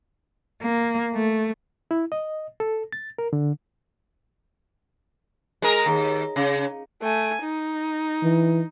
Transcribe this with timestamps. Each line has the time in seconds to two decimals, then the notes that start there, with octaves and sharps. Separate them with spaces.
0.62 A#3
1.14 A3
1.91 E4
2.12 D#5
2.60 A4
2.92 A6
3.18 A#4
3.33 D3
5.62 G#3 A#4
5.86 D#2
6.36 C#3
7.02 A3 G#5
7.43 D#4
8.23 E3